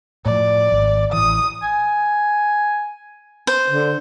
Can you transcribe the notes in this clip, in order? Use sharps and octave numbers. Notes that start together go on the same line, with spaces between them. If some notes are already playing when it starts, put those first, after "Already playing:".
A2 F3 D5
G#1
A1 E3 D#6
G#5
C5
D3